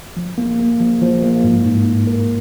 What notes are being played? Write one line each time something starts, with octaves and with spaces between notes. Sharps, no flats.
F3
A#3
A#3
F3
F3
A#3
G#2
G#2
G#2
A#4